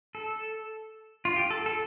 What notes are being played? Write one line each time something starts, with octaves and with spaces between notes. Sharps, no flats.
A4
F4
G4
A4
A4